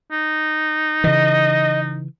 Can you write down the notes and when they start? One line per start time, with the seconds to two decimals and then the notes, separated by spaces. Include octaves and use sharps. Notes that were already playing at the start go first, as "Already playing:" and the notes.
0.11 D#4
1.04 C#3 E3 D#5